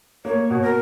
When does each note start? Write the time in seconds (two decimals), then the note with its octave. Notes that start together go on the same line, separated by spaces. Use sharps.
0.25 A#3 C#5
0.50 B2
0.62 A#4